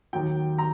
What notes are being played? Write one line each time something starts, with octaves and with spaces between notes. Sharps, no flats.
D#2 D#3 F#3 G5
A#5